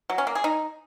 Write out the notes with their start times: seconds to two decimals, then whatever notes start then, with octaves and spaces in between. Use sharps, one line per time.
0.10 F#3
0.18 C#4
0.27 A#3
0.35 G#4
0.44 D#4